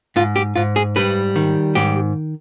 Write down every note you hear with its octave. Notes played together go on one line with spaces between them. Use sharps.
G#2 F4
G4
G#2 F4
G#4
G3 B4
D#3
G#2 G4